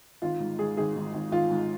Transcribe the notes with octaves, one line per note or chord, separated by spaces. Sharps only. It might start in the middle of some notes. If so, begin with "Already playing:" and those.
G#1 F4
G#2
G#2 G#4
G#1 G#4
G#2
G#1
G#1 F4
G#2